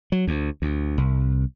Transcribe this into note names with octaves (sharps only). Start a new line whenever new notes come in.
F#3
D2
D2
C2